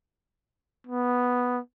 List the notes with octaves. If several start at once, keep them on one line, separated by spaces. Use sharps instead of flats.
B3